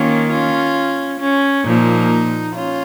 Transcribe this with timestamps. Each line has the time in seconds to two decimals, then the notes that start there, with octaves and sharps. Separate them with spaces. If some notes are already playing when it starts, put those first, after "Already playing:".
Already playing: D#3 A#3 C#4 F4
0.30 C#4 F4
1.19 C#4
1.64 A#2 F3 A#3 D#4
2.54 C#4 F4